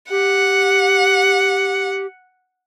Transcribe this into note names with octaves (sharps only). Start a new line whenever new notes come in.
G4 F#5